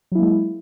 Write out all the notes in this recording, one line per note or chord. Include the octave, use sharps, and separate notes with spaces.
F#3 G#3 A#3 E4